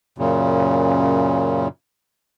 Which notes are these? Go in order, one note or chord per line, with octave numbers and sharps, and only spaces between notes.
F#2 A#2 C#3